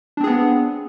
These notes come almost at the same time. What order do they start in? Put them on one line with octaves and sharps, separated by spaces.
D4 C4 G#4 B3